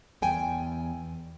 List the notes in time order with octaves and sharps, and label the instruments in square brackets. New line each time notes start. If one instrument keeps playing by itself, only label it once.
[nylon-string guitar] E2 G5 G#5